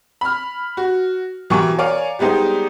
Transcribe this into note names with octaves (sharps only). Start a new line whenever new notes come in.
B5 F6
F#4
B2 E3 G4 A#4 G#5 C#6
A#4 C#5 D5 F5 G#5 D6
G3 G#3 B3 D#4 G4 C5